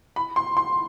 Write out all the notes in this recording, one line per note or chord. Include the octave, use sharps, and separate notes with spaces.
B5
C6
C6